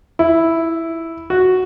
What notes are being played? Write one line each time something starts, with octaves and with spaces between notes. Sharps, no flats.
E4
F#4